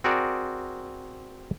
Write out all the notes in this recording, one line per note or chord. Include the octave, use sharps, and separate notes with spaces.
C4 F#4 G#4 A#4 D5